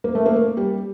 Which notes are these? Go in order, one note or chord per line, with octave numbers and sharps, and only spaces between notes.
A#3
A3
A#3
G3